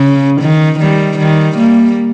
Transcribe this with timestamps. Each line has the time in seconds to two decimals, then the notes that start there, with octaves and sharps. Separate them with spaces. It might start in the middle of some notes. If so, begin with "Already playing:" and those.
Already playing: C#3
0.41 D#3
0.80 D#3 G3
1.18 D#3 G3
1.57 G3 A#3